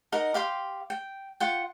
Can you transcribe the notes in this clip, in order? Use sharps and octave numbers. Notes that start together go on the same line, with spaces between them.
D#4 A#4 D#5 F#5
G4 F5 G5 C6
G5
F4 F#5 G5